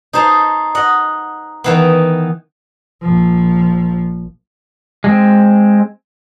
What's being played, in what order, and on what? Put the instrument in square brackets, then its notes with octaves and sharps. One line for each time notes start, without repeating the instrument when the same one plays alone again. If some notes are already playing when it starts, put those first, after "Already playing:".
[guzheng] D#4 G#4 C5 A5
D#5 F#5
D#3 E3 B3
[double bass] A#1 F3
[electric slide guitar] G#3 C4